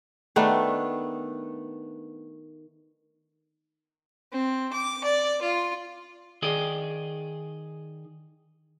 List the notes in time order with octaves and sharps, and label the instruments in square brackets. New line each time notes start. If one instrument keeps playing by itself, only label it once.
[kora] D#3 A3 B3 D4
[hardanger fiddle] C4
D6
D5
F4
[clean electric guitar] D#3 G#4 D5 D#5